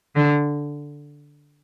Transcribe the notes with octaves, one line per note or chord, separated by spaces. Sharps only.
D3